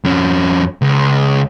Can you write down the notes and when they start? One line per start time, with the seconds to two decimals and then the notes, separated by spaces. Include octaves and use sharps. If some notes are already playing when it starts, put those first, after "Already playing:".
0.04 F2 C#4
0.82 C#2